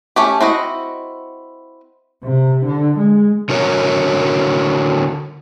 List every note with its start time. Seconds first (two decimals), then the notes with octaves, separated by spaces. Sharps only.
0.16 A3 C#4 G4
0.40 C4 E4 F#4 D#5
2.24 C3
2.65 D3
2.99 G#3
3.49 D3 F#4 A#4 C#5